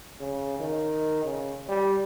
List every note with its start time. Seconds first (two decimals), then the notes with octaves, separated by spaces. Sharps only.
0.20 C#3
0.60 D#3
1.25 C#3
1.69 G3